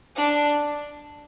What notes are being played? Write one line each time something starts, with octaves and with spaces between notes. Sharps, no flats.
D4